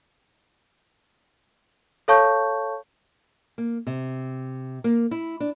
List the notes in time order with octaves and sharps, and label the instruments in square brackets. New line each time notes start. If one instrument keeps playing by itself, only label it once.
[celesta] A4 C#5 F5 A5 C#6 G6
[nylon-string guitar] A#3
C3
A#3
E4
D4